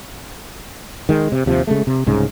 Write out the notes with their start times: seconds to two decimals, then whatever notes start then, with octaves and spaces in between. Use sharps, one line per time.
1.09 D#3 G#3
1.32 C3
1.46 D#2 C3 F3
1.67 C#3 G#3 A3
1.87 C3
2.06 C2 G#2 C#3